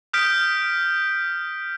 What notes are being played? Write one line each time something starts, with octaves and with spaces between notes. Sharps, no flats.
D#6 F6 G6 B6 D7